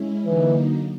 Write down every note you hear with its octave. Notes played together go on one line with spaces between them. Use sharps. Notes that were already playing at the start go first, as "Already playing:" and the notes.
Already playing: G#3 C#4 E4
D3 E3 F#3 A#3 D#4